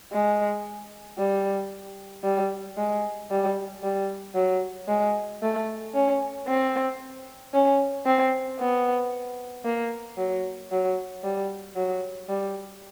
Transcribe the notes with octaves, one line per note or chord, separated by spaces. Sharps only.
G#3
G3
G3
G#3
G3
G3
F#3
G#3
A3
C#4
C4
C#4
C4
B3
A#3
F#3
F#3
G3
F#3
G3